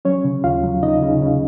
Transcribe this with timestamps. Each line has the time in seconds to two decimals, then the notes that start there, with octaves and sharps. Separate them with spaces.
0.05 F#3 C#4 C#5
0.25 C#3
0.44 D#2 F4 F5
0.64 F#3
0.83 C#3 D#4 D#5
1.02 C#3
1.22 C#3